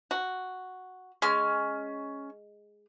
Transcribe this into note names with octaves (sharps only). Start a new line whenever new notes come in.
F#4
G#3 C#4 F6